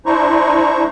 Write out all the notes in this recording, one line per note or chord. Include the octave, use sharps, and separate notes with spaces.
D4 E4 C5 A#5 C#6